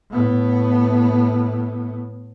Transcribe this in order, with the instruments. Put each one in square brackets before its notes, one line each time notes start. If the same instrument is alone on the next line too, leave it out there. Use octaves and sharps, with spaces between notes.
[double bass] A2 B3